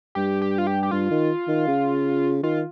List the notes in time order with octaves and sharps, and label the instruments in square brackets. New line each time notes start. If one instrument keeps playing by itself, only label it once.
[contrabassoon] G2 [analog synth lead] G4
[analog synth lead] G4
F4
G4
G4
[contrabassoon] G2 [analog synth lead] F4
[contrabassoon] D#3
D#3
C#3
[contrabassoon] D#3 [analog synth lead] F4